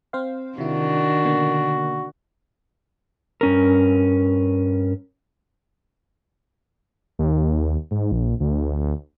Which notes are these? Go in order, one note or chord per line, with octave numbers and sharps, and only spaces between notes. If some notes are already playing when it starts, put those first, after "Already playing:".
C4 C5 F5
C3 D#3 D4 E4 F#4
B2 D3 A#3
G2 C#4 A#4
D#2
G#2
A#1
D2